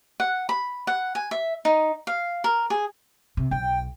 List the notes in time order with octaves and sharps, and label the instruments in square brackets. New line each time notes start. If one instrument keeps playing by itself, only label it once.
[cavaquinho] F#5
B5
F#5
G#5
E5
D#4
F5
A#4
G#4
[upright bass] C3
[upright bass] B1 [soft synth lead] G5